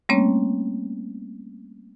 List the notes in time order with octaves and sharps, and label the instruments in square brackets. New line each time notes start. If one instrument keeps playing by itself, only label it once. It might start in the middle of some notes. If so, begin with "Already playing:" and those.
[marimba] G3 A3 A#3 C4 C#4 C#5